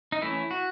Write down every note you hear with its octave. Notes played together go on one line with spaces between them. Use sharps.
D#4
E3 A3 C#4 E4
F#4